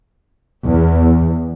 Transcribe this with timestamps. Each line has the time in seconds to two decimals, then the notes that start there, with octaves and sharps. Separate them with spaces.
0.66 E2